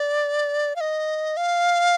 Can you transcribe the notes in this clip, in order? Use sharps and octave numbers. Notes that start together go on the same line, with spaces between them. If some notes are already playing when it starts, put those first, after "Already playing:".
Already playing: D5
F5
D#5
F5